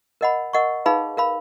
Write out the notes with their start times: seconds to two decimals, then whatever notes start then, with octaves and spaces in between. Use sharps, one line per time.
0.21 A#4 D#5 F#5 B5
0.53 A#4 D#5 F#5 C#6
0.86 D#4 G#4 B4 F5 B5
1.17 A#4 F5 B5